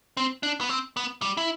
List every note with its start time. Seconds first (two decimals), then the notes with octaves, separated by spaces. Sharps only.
0.17 C4
0.43 D4
0.61 B3
0.69 C4
0.97 B3
1.22 G3
1.37 E4